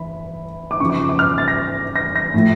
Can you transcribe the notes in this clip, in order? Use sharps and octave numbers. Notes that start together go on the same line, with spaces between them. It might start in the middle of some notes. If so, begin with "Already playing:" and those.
Already playing: E3 B5
D6
C#3 F3 C#6
D6
D6
F6
A6
A#6
A#6
A#6
A2 F3